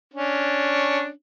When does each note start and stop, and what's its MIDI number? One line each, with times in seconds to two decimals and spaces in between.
0.14 1.09 61
0.14 1.09 62